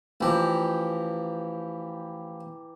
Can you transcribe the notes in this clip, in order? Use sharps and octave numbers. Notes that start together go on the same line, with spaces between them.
A1 E3 F3 G4 A#5